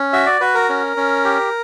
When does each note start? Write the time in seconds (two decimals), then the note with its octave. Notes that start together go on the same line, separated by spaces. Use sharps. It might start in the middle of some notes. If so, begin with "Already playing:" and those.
Already playing: C#4
0.13 F#4 E5
0.26 D5
0.41 F#4 B4
0.54 A#4
0.69 C#4
0.97 C#4
1.25 G4